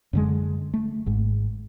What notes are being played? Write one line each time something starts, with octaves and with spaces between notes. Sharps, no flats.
F#2 D3 G#3
A3
G#1 G#2